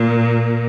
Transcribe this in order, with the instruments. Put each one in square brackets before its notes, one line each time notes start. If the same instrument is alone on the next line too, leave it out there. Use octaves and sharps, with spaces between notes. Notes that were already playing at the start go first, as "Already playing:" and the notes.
Already playing: [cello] A#2